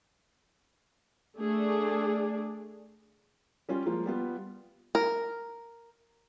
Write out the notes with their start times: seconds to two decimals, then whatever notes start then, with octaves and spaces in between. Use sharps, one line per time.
1.38 A3 D4 G#4 D5
3.69 G3 C#4 F4
3.86 F3 G#3 A#3 F4
4.06 G3 B3 F4
4.95 A#4